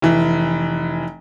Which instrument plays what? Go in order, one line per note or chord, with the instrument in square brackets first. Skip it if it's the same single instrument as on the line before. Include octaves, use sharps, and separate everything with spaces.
[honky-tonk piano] F1 E3